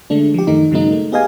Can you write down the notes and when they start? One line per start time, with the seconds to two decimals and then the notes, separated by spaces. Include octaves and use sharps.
0.10 D3 G#3 A3 D4
0.34 F3 G4
0.47 F#2 D#3 A3 D#4
0.71 G2 C#3 F#3 G#3 A#3 D#4
0.92 A3
1.12 B3 G4 G#4 D#5 F5 G#5